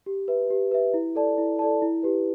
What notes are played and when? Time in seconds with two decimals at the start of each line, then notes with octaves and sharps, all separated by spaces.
0.06 G4
0.28 B4 E5
0.50 G4
0.71 B4 E5
0.94 E4
1.15 A4 D5 A5
1.38 E4
1.59 A4 D5 A5
1.82 E4
2.03 G4 B4